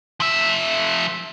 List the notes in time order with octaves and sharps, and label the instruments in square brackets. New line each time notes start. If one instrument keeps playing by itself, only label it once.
[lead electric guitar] F3 E5